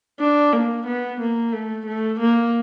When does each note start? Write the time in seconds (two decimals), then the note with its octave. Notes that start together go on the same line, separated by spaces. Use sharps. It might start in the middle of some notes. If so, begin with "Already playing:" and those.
0.20 D4
0.53 A#3
0.87 B3
1.20 A#3
1.53 A3
1.86 A3
2.20 A#3